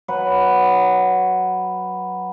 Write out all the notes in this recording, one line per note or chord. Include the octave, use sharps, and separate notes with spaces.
F#3 B4 F#5